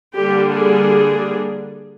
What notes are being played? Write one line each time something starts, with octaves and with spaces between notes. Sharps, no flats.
D3 G3 A#3 D4 G4
G#4